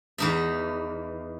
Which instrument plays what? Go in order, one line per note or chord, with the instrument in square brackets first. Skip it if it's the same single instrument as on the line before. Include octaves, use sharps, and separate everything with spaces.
[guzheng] E2 D#4 E5